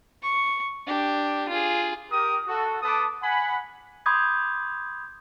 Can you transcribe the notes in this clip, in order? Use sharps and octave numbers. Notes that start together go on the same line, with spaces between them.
C#6
D4 G4
F4 G#4
G4 A#4 D#6
F#4 A4
B3 A4 B4 A5 D6 D#6
F#5 G#5 B5
B5 C6 D6 D#6 G6 G#6